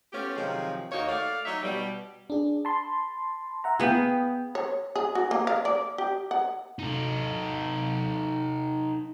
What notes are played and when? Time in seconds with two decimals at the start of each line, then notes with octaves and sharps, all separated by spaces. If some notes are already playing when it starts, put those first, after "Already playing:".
0.13 A3 B3 C#4 F4 G4
0.36 C3 D#3 F3 F#3 G#4
0.91 D#2 A#3 D#4 F#4 C#5
1.09 A3 D5 F5
1.45 F#3 D#4 C#5 E5
1.63 B2 G3
2.30 D4 G#4
2.65 A5 B5 C6
3.64 E5 F#5 A#5
3.80 B3 G#4 F5 G5
4.55 C#5
4.96 G#4
5.15 F#4
5.31 A#3
5.47 F5
5.65 D5
5.98 G4
6.31 F#5
6.79 D#4 A4